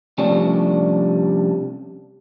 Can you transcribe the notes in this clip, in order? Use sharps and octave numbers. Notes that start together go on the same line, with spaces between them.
C3 F3 G3 A3 C#4 D4